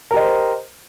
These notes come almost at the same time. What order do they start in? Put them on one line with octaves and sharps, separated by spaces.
A#4 G4 D#5 C5